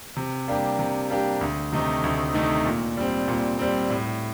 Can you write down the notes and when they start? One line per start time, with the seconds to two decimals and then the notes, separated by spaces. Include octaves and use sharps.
0.17 C3
0.48 G3 A#3 D4 G4
0.79 C3
1.10 G3 A#3 D4 G4
1.41 D2
1.72 C3 D#3 A3 D#4
2.04 D2
2.34 C3 D#3 A3 D#4
2.65 A#2
2.97 G3 C4
3.28 A#2
3.59 G3 C4
3.90 A2